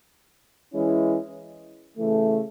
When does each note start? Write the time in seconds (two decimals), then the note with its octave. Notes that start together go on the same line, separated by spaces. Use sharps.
0.74 E3 G#3 C#4 E4
1.98 C#3 E3 A3